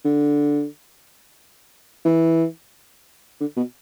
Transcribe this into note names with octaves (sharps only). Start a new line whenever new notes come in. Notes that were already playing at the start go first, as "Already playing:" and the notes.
D3
E3
D3
B2